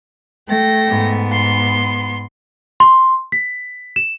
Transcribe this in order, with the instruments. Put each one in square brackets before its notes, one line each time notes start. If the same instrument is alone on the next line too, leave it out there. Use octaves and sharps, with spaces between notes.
[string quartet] A3 G5 A#6
[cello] G#2 B3
[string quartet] C6
[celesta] C6
B6
E7